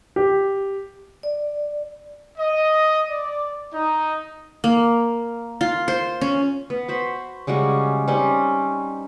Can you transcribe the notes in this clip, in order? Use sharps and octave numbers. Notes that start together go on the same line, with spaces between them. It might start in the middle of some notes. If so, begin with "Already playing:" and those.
G4
D5
D#5
D5
D#4
A#3
F4
C5
C#4
B3
F#4 C5 B5
C#3 G3 G#3 F#4
G3 C4 C#4 D#4